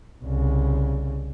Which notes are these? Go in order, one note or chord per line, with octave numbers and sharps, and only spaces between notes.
C2 C#3